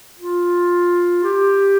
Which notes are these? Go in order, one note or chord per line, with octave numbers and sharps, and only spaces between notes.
F4
G4